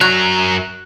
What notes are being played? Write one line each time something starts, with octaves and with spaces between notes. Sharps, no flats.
F#2 F#3 A#5 F#6